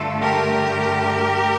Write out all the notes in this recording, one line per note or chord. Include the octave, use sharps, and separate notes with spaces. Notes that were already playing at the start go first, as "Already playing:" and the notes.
Already playing: G2 D3 A3 F4 A4
G4 A#4